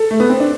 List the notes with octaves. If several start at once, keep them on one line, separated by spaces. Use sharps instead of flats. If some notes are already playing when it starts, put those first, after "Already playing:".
Already playing: A4
A3
B3
C4
D4